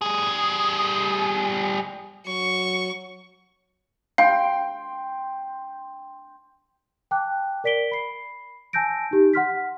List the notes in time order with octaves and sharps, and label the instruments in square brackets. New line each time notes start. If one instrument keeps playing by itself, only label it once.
[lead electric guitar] G3 G#4
[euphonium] F#3 [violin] C#6
[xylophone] F5 [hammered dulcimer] G5 C6
[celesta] G5 A5 D6 F#6
A#4 D5 B6 D7 G7
B5 C7
G#5 A5 E6 G6 A#6 D7
D#4 G4
F#5 C6 F6 B6